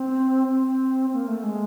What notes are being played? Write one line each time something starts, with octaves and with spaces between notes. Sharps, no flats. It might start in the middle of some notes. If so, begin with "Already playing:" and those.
Already playing: C4
C4
A#3
A3
G#3